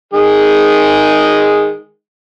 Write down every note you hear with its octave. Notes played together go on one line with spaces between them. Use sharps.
D#3 G#3 G#4